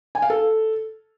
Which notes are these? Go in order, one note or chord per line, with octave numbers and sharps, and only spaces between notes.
G#5
F5
A4